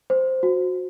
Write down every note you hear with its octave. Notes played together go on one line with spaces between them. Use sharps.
C5
F#4